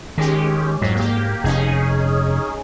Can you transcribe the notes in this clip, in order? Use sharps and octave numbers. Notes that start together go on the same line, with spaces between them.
D#3 G#3 C#4 G4
F2 G#2 F#3
A#3 G4
F1 C#4 D#4 G#4